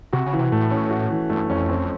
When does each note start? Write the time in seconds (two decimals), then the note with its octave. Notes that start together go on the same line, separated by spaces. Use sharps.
0.13 C3 F#4
0.26 C#3
0.33 E3
0.39 C3
0.52 A2 A3
0.71 C#4
0.90 F#4
1.10 E3
1.30 G2 A3
1.50 F2 C#4
1.69 C4